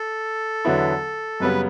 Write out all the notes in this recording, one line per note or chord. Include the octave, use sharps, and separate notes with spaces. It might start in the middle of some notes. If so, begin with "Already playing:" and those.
Already playing: A4
E2 D3 F#3 B3 E4
F#2 C#3 G3 B3 B4